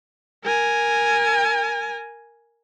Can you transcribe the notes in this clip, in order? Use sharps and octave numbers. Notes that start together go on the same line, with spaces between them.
A#4 G#5